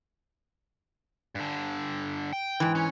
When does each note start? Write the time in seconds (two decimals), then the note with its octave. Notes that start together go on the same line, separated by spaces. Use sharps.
1.35 G2 D3
2.33 G5
2.60 G#2 E3
2.75 C#4